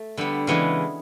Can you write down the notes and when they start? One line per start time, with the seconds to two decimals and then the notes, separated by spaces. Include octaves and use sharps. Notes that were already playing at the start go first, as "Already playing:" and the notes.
Already playing: A3
0.17 D3 G3 B3
0.47 C#3 E3 G#3 B3